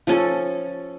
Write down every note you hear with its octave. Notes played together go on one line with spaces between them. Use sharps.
F3 C#4 A4